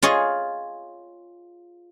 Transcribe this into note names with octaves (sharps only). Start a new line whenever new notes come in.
F4 G#4 C#5 D#5